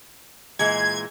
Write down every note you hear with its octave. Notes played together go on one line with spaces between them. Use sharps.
A#2 E3 G#3 G#6